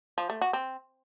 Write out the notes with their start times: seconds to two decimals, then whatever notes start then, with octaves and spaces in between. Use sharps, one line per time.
0.18 F3
0.30 A3
0.41 F#4
0.53 C4